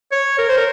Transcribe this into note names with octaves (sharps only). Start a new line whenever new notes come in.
C#5
A#4
C5
A#4